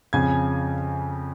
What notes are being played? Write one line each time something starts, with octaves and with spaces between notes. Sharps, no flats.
F2 C#3 F3 G#5 G#6